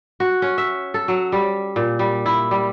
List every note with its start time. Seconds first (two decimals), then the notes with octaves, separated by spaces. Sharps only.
0.20 F#4
0.42 C#4
0.58 E5
0.94 A4
1.08 F#3
1.32 G3
1.76 A#2
1.99 G3
2.26 E4
2.51 G3